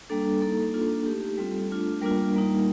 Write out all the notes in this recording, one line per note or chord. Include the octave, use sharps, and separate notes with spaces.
G3 A#3 D4 A4
A#3 D#4 A4
A#3 D4 F4
A3 D#4 G4
G4
G3 C4 F4 A4
A3 D4 F4
G3 A#3 D4 F4 A#4
G3 A#3 D#4